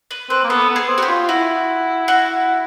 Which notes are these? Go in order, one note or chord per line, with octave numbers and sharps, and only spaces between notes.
B4
C4 B4
A#3
B3 A4
B3
G#4
C4
F#4
G4
F4
E4 F#4
F#4